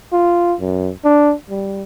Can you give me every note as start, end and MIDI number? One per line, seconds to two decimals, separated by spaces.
0.12 0.54 65
0.60 0.91 42
1.05 1.34 62
1.50 1.83 55